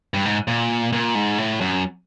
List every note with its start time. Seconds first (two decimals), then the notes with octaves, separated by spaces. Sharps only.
0.14 G2
0.25 G#2
0.48 A#2
0.93 A#2
1.15 G#2
1.38 A2
1.61 F#2